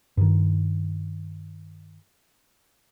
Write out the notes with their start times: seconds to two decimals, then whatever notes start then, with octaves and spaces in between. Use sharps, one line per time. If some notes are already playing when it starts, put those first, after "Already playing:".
0.17 G2 D#3